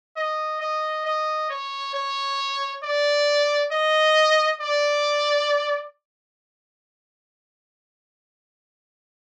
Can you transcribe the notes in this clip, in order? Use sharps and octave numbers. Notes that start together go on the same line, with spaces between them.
D#5
D#5
D#5
C#5
C#5
D5
D#5
D5